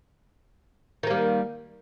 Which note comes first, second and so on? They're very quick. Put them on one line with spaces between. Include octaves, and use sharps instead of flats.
D#3 A#3 G3